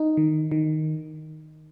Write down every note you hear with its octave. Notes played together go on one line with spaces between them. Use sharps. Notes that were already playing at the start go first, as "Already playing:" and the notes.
Already playing: D#4
D#3
D#3